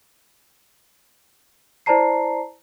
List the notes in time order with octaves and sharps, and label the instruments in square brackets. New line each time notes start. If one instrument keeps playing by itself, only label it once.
[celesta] E4 C5 D5 A5 A#5 C7